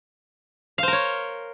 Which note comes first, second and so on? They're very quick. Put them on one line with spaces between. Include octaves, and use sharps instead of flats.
F5 C5 A#4 C#5